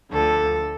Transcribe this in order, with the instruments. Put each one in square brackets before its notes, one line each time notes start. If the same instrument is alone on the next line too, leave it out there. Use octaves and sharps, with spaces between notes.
[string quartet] D2 D3 F3 A4